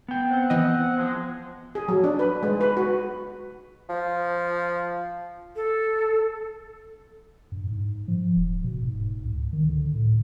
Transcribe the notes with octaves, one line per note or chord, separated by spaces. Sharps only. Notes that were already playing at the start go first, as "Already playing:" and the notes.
B3 G5
C4 F#5
E3 D#5
F3 G#3
G#4
F#3
D4
B4
G#3
B4
F#4
F3
A4
G2
G#2
F3
E1
B2
G#2
C#2
D#3
D3
A2